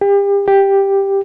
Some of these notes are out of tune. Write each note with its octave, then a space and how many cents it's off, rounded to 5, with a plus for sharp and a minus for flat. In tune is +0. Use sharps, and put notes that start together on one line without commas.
G4 +35
G4 +5